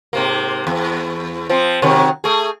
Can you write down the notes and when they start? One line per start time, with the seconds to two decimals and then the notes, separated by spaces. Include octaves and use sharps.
0.13 G#2 C3 A#3
0.67 E2
1.49 F3 C4
1.82 C3 D#3 F#3
2.24 A3 G#4